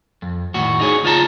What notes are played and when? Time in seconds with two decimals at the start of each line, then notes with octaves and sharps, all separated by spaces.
0.22 F2
0.54 D#2 A2 F#4
0.80 D#4 G#4 C#5
1.04 C#2 F4 C5 A5 A#5